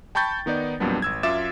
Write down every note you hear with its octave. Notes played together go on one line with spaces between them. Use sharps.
G5 A5 B5 C#6 G6 A6
D#3 B3 D#4 D5
F2 A#2 F#3 G3 B3 D4
G#1 E6 G#6
F#2 F4 E5 D6 A6 E7